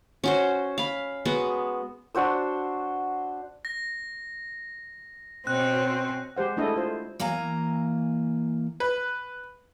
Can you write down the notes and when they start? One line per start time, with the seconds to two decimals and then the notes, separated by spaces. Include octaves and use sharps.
0.24 C#4 F#4 C5
0.78 F5 B5
1.25 G#3 B3 F#4
2.15 D4 F#4 C5 E6
3.65 A#6
5.47 B2 C4 C#4 C5 F#6
6.37 G#3 G4 C5 F#5
6.57 G#3 A3 D4 E4 A4 D#5
6.76 F4 C5
7.20 E3 A#3 G#5 A#5
8.80 B4